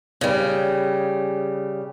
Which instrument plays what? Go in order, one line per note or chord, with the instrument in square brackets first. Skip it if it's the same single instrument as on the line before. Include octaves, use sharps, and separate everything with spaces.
[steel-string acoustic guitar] C#3 G3